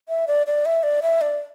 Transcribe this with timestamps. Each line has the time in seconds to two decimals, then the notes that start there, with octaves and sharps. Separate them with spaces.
0.09 E5
0.28 D5
0.47 D5
0.66 E5
0.83 D5
1.02 E5
1.21 D5